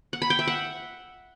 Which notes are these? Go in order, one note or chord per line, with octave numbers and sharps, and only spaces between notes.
F#5
B5
G5
E5
F#5